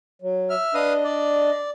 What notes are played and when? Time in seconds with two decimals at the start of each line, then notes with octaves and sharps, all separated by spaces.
0.22 F#3
0.50 E5 F6
0.74 D4 B4 D#5 F5 D#6
1.04 D5